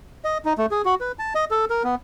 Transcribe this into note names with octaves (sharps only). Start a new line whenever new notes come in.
D#5
D#4
A3
G#4
F#4
B4
A5
D#5
A4
A#4
B3